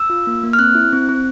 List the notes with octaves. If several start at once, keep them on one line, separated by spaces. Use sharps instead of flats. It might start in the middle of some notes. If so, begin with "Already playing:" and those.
Already playing: E6
F4
A#3
A#3
F6
C4 F#6
E4
C4
C4